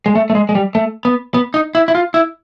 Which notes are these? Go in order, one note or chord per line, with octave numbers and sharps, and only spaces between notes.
G#3
A3
A3
G#3
G#3
G3
A3
B3
B3
D#4
E4
E4
F4
E4